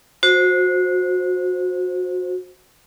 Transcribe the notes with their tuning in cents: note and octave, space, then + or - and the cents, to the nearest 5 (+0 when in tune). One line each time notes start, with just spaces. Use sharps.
F#4 -25 C5 +0